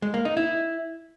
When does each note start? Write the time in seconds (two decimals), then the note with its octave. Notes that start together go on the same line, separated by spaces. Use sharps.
0.02 G#3
0.14 A#3
0.25 D#4
0.37 E4